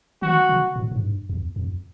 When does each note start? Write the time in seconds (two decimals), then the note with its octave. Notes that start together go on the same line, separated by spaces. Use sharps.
0.22 D#3 F#4
0.49 C#3
0.76 A2
0.91 G#2
1.03 G2
1.29 E2
1.56 F2